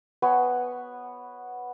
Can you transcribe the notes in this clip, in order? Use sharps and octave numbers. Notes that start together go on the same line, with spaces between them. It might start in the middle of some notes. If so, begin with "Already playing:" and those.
B3 C#5 G#5